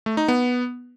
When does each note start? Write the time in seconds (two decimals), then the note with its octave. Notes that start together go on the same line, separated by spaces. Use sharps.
0.06 A3
0.17 D#4
0.28 B3